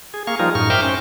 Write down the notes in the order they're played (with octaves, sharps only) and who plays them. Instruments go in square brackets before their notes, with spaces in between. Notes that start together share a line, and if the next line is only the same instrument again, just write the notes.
[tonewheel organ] G#4
A#3 G#4 F5 C#6
F3 G3 D#4 F4 G#4 A#4
F#2 A2 D#4 C#6 F6
A#4 C5 E5 G5 D6 F6
C#4 C5